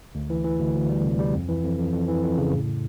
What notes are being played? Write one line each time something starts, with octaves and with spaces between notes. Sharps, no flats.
D2
E3
E3
D2
D2
G3
C3
G3
F2
E3
F2
F2
F2
E3
F2
C#3
A2